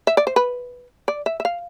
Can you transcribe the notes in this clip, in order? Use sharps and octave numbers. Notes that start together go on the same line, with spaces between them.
E5
D5
C5
B4
D5
E5
E5
F5